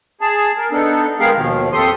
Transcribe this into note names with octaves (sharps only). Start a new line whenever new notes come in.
G#4 A5
A#4
B3 D4 D#4 A4
G#3 B3 G4 G#4 A#4 F5
D#2 B2 D#3 F3
F2 G4 A4 C6 D#6